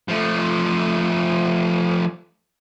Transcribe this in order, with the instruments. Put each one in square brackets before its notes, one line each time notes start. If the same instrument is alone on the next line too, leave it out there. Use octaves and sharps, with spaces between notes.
[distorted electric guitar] F3 A3